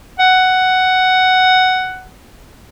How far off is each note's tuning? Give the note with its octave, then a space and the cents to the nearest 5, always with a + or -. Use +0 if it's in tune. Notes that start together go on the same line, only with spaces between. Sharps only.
F#5 +5